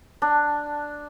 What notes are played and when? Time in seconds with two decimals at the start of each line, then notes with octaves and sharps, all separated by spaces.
0.22 D4